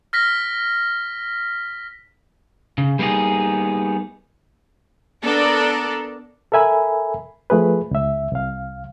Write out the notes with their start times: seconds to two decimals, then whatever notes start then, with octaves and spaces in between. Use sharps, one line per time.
0.13 F6 A#6 B6
2.78 C#3
2.99 G3 A#3 B3 D#4 G#4
5.24 B3 D4 A4 A#4
6.52 A4 A#4 E5 G#5 B5
7.50 F3 A3 G#4 B4
7.91 C#2 E5
8.32 C2 F5